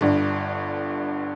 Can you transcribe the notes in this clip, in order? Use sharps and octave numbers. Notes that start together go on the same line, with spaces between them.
G1 G2 D3